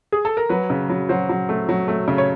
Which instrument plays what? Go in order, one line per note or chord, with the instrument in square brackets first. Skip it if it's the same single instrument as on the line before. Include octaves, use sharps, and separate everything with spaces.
[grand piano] G#4
A4
A#4
[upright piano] F#3 [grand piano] B4
[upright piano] C#3
F#3
[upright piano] F#3 [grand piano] C5
[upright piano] F#3
A3
F#3
A3
C#3
[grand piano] C#5